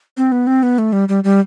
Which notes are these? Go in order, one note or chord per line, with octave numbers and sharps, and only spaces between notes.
C4
B3
C4
B3
A3
G3
G3
G3